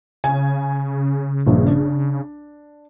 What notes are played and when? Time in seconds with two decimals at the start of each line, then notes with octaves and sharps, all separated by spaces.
0.24 C#3 G#5
1.46 A#1 G2
1.67 D4